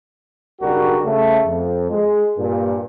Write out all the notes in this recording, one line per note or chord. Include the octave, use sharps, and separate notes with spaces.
B1 C#3 G3 D4 F#4 A#4
C#3 A3
F2
G#3
G2 A#2